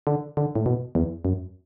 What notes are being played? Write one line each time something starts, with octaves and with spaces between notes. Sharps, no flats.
D3
D3
A2
B2
E2
F#2